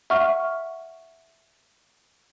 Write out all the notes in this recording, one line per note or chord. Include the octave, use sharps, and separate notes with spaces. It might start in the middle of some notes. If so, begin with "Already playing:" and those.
E5 F#5 C#6 F6